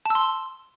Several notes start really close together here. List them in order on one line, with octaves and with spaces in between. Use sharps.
A5 E6 C6